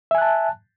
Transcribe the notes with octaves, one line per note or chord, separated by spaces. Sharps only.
E5 G#5 A5 F#6